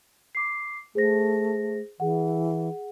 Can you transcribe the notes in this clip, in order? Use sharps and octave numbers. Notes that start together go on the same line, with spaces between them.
D6 C7
A3 G#4 C5 A#6
E3 G#4 F#5